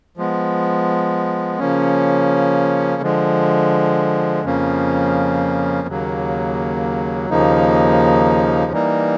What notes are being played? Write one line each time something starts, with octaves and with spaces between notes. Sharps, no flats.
F3 G#3 B3
C#3 F3 A#3 C#4
D3 F3 G#3
F2 C#3 F3 A#3 C#4
D#2 C#3 F#3 A#3
D#2 C#3 F3 A#3 D#4
E3 G3 A#3 D#4